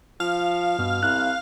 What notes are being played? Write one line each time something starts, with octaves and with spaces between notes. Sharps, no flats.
F3 F5
G2 B2
C2 F#6